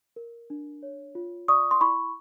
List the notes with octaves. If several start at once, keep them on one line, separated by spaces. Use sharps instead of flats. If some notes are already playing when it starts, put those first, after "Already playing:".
A#4
D4
C#5
F4
D5 C#6 D#6
C6
E4 B5 C#6